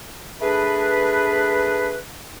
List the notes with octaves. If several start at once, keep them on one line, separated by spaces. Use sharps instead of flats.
A3 D4 G#4 B4